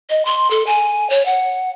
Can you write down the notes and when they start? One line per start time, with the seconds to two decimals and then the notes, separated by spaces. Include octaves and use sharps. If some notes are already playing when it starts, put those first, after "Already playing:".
0.10 D#5
0.25 C6
0.51 A4
0.67 G#5
1.10 C#5
1.26 F#5